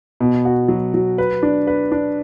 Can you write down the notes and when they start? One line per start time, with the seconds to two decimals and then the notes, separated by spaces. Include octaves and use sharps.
0.20 B2
0.45 F#4
0.68 F#3
0.94 F#3
1.18 B4
1.43 D4
1.67 B4
1.92 D4